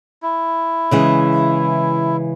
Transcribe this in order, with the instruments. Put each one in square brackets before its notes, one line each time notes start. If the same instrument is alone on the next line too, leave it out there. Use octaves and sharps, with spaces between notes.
[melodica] E4
[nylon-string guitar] C#3 E3 G#3